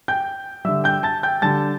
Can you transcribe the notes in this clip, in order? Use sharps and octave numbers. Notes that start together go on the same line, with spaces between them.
G5 G6
D3 G3 E5 E6
G5 G6
A5 A6
G5 G6
D3 G3 A5 A6